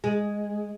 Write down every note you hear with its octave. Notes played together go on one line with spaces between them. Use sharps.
G#3